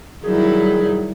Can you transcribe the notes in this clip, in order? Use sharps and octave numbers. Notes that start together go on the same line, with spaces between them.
D#3 F#3 G3 D#4 E4 G#4